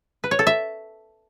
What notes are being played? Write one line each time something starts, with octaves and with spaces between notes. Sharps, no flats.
B4
C#5
A4
E5